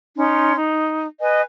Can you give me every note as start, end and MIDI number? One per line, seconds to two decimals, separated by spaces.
0.17 0.56 61
0.17 0.56 63
0.17 0.56 84
0.57 1.07 63
1.21 1.42 71
1.21 1.42 75
1.21 1.42 80